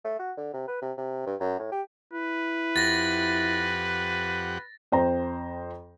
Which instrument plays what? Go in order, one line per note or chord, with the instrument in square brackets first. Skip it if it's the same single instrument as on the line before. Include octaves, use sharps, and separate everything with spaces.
[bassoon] A3
F#4
D3
C3
B4
C3
C3
G2
F#2
A2
G4
[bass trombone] E4 [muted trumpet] B4
[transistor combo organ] F2 G4 F#5 [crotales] A6 A#6
[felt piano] F2 C5 G5 A#5